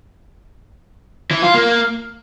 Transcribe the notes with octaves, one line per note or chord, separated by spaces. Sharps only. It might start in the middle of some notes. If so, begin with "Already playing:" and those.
E3
F4
A#3